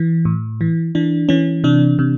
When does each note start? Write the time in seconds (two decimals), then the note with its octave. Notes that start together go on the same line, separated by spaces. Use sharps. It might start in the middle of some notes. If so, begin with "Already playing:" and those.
Already playing: E3
0.25 A2
0.61 E3
0.95 E3 D4
1.29 E3 C#4
1.64 C3 D4
1.99 C3